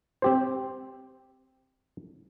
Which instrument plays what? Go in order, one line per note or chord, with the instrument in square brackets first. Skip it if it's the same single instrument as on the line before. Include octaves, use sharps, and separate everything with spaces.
[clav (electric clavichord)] C4 G4 C5